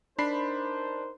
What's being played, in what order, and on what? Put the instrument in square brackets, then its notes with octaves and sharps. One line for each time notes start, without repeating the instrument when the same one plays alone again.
[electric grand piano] D4 B5 C7 [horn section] D#4 A#4 C5